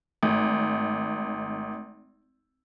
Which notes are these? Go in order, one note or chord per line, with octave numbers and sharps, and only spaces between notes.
G#1 A3